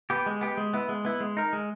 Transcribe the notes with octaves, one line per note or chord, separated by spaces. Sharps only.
B3 G4
G#3
B3 G4
G#3
B3 E4
G#3
B3 E4
G#3
D#4 A#4
G#3